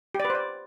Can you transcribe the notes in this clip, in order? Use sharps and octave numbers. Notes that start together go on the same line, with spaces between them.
G4
D5
B4
C5
D5